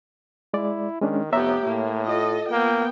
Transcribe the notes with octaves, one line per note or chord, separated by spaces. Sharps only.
G#3 E4 D5
D#3 G#3 C#4 D4
F1 B3 G4 C#5 E5 A#5
A2 A#3
F4 A4 D#5
A#3 B3 G5